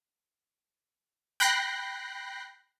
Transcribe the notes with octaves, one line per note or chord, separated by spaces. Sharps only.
G5 B5 F#6 G6 A#6 C7